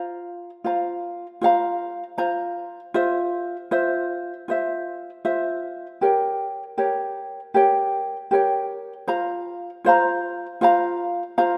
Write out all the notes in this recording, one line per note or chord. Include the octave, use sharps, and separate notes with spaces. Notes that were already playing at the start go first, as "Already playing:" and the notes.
Already playing: F4 C5 F5 A#5
F4 C5 F5 A#5
F4 C5 F5 A#5
F4 C5 F5 A#5
F4 C5 E5
F4 C5 E5
F4 C5 E5
F4 C5 E5
G4 A#4 C#5 G5
G4 A#4 C#5 G5
G4 A#4 C#5 G5
G4 A#4 C#5 G5
F4 C5 F5 A#5
F4 C5 F5 A#5
F4 C5 F5 A#5
F4 C5 F5 A#5